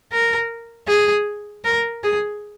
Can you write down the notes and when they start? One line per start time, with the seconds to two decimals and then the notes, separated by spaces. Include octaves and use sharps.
0.12 A#4
0.88 G#4
1.65 A#4
2.04 G#4